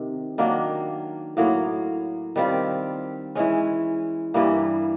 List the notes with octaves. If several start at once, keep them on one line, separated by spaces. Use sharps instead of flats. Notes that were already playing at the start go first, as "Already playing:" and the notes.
Already playing: C3 D#3
D#3 F#3 A#3 D4
A2 F#3 A#3
D#3 G3 C4 F4
E3 G#3 C#4
G2 E3 G3 A#3